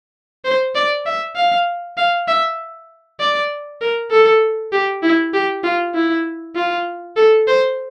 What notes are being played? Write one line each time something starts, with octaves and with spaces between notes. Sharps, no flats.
C5
D5
E5
F5
F5
E5
D5
A#4
A4
G4
E4
G4
F4
E4
F4
A4
C5